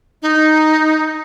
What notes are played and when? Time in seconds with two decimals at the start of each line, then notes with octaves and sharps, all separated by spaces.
0.22 D#4